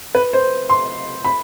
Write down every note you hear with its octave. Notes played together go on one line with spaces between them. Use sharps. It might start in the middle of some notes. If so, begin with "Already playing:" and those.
B4
C5
C6
B5